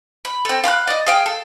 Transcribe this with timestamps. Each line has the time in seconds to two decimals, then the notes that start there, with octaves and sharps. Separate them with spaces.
0.25 B5
0.45 C4 A4
0.64 F5 B5 C6 F#6
0.87 D5 D#5
1.07 G#4 F5 G5
1.26 A4